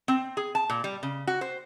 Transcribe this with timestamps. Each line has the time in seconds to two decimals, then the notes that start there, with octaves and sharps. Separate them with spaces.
0.08 C4
0.37 G#4
0.55 A5
0.70 A#2
0.84 G3
1.03 C#3
1.27 F#4
1.41 C5